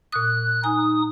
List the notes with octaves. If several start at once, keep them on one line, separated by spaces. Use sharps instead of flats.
A#2 D#6 F#6
D#4 G#5 D#6